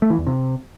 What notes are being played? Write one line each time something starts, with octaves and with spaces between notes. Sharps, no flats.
A3
E3
E2
C3